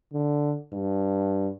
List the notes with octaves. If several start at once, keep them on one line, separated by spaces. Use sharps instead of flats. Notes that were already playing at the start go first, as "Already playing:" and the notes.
D3
G2